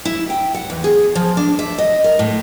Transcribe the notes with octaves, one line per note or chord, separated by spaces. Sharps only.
E4
G5
F#5
E2
G#4
F3
D4
E5
D#5
A#4
A2